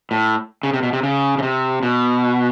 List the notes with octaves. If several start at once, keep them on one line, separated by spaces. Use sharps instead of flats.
A2
C#3
C3
B2
C3
C#3
C#3
C3
B2